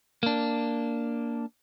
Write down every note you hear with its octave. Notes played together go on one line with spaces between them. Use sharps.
A#3 D4